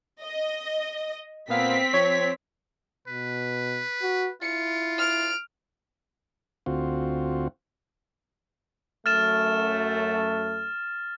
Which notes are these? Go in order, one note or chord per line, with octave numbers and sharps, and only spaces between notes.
D#5
A#2 B3 C4 F5 B6
F3 C#5
B2 B4
F#4
E4 F4 C#7
F6 D7
D2 C4 F4 F#4
F#2 A3 F6 A6 E7